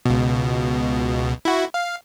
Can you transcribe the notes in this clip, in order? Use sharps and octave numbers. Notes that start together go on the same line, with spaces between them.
C#2 B2
E4 F#4
F5